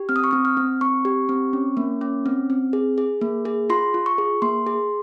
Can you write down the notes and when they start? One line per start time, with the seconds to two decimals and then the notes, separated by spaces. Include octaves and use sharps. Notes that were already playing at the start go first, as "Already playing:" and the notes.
Already playing: G4
0.09 C4 F6
0.16 D#6
0.24 C#6
0.31 C4 D#6
0.45 F6
0.57 C4
0.81 C4 C#6
1.05 G4
1.29 C4
1.53 C#4
1.77 A#3
2.01 C#4
2.26 C4
2.50 C4
2.73 G#4
2.98 G#4
3.21 A#3
3.45 G#4
3.70 F4 C6
3.94 F4
4.06 C#6
4.18 G#4
4.42 A#3 C6
4.67 G#4